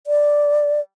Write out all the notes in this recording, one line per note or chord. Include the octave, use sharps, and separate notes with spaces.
D5